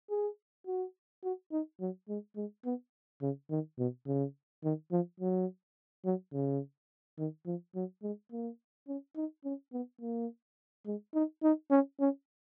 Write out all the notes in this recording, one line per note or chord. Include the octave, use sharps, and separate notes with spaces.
G#4
F#4
F#4
D#4
F#3
G#3
G#3
B3
C#3
D#3
B2
C#3
D#3
F3
F#3
F#3
C#3
D#3
F3
F#3
G#3
A#3
C#4
D#4
C#4
B3
A#3
G#3
D#4
D#4
C#4
C#4